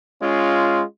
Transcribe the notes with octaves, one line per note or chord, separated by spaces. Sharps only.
G#3 C#4 F4